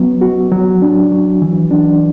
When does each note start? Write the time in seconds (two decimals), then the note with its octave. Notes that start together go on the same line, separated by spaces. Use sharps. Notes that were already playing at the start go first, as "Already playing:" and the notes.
Already playing: F#3 B3
0.21 F#4
0.52 F#3
0.82 D4
1.12 F#3
1.42 E3
1.71 D4